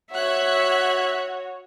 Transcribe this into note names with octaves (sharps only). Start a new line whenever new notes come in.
F#4 C#5 E5 F#5 F#6 G#6